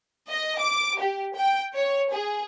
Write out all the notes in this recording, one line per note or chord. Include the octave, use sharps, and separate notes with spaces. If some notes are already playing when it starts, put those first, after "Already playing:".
D#5
D6
G4
G5
C#5
G#4